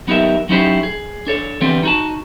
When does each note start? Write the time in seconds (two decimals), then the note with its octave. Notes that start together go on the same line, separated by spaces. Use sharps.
0.07 F#3 B3 D#4 G4 A#4 E5
0.49 F#3 C#4 D#4 E4 G4 C5
0.83 G#4
1.27 D4 A4 C#5
1.61 D3 E3 G3 B3 C4
1.83 D#4 F#4 A5